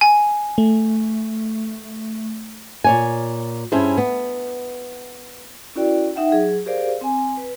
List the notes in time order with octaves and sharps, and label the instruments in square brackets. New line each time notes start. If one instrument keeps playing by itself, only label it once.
[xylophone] G#5
[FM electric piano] A3
[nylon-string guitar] A#2 C#5 G#5
G2 C#4 E4 G#4 C5
B3
[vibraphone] C#4 E4 F#4 A#4 D5 G5
D#4 E5 F#5 G5
F#3 G#4
G4 G#4 A#4 C5 D5 F5
C4 G#5
B4